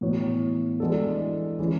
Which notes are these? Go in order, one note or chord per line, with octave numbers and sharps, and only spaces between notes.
A2 E3 B3 F#4 C#5
E3 G#3 D4 F#4 A4
E3 G#3 C#4